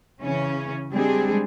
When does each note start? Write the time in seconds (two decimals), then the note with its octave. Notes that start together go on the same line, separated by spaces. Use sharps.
0.21 C#3 E3 C#4
0.93 G3 G#3 C4 D4 G#4